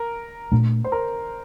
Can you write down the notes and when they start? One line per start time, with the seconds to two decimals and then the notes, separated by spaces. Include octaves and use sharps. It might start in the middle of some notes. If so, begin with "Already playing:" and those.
Already playing: A#4
0.52 A#2 A3 D4
0.84 C5
0.92 A#4